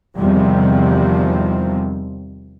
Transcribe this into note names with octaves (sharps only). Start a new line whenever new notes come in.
E2 C3 D#3 F3 G3 C4